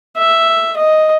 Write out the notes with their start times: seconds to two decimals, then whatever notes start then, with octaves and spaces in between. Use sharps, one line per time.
0.17 E5
0.77 D#5